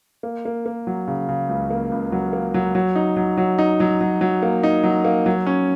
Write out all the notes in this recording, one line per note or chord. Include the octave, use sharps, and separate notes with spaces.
A#3
A#3
A#3
F#3
C#3
C#3
C#2
A#3
C#2
F#3
A#3
F#3
F#3
D#4
F#3
F#3
D#4
F#3
F#3
F#3
A#3
D#4
F#3
A#3
F#3
C#4